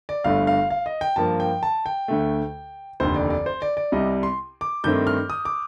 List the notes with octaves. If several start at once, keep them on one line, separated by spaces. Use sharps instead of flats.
D5
G1 G2 D3 A3 F5
F5
F5
D#5
G5
G2 F3 A#3 A5
G5
A5
G5
D2 D3 A3
F1 D#2 D3 C5
D5
D5
C5
D5
D5
C2 C3 G3 D#5
C6
D6
G2 D#3 A3 C4 G6
F6
D#6
D6